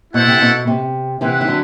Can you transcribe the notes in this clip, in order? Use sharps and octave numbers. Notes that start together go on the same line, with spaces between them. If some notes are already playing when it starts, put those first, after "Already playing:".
B2 E4 A4 C5 F#5
C3
B2
C3
C3 E3 E4 B4 F#5
E3
D3 F#3